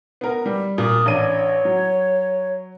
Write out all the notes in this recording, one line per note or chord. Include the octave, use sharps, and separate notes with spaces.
B3 A#4
G3
A#2 D#6
A1 D4 C#5 D#7
F#3